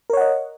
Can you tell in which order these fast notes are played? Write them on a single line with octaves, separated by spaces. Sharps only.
A#4 C#5 F#5 D#5